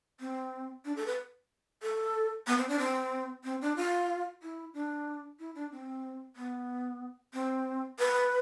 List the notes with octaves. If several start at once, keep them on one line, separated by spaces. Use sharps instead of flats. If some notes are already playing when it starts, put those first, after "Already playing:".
C4
D4
A4
B4
A4
B3
C4
D4
C4
C4
D4
F4
E4
D4
E4
D4
C4
B3
C4
B4